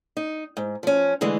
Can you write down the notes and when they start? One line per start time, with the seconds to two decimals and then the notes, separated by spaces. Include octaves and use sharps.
0.17 D#4
0.57 G#2
0.83 F3 C#4
1.21 D3 E3 G#3 A3